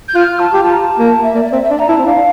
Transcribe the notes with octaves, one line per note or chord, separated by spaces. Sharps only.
G6
F4 F6
F4 A5
G4
F4 A5
A#5
A5
A#3
E5
A#3 D5
D5
C4 E5
E5
D4 D5
A#5
E4 A5
C4
D4 F5